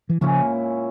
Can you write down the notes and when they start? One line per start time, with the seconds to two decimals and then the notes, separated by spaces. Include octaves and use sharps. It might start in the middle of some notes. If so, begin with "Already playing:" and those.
0.10 E3
0.21 A#2 C#3 F3 G#3 C#4 E4